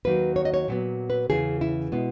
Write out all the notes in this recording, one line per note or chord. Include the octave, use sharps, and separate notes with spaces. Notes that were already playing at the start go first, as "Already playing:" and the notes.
D#2 D#3 F#3 A#3 B4
C#5
D#5
C#5
A#2 F#3 B3
B4
E2 C#3 E3 G#4
E4
B2 G#3 B3